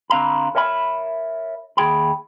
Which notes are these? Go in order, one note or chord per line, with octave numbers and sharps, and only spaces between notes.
D3 C4 F5 A#5 B5
A#4 C#5 E5 G5 B5
D#2 G#4 G5 B5